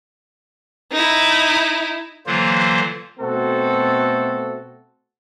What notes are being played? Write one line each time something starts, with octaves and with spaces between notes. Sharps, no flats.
D#4 E4
D3 E3 F#3 A#3 F4 C5
B2 A3 C4 F#4 A4